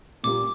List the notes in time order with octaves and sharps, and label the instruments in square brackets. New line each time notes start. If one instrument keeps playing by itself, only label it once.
[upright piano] A#2 G3 A#3 [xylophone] D6